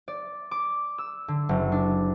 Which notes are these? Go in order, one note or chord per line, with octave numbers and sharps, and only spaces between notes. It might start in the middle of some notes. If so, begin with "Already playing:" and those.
D5
D6
E6
D3
F#1
D4